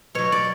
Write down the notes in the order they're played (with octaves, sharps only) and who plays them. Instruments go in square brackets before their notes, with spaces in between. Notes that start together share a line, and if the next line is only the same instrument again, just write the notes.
[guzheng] B2 F#3 C#5
D5